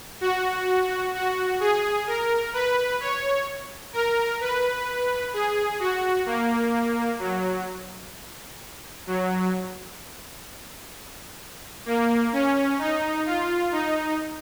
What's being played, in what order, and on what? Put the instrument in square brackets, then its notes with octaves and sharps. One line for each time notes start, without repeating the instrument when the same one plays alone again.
[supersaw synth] F#4
F#4
G#4
A#4
B4
C#5
A#4
B4
G#4
F#4
A#3
F#3
F#3
A#3
C#4
D#4
F4
D#4